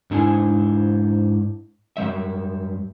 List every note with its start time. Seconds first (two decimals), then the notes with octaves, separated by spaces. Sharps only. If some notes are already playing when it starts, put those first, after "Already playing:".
0.11 G#2 D4 E4 C5 G#5
1.97 F#2 D#3 G3 E5